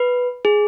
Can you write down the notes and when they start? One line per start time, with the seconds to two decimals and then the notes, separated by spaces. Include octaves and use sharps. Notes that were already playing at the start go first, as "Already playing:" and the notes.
Already playing: B4
0.45 G#4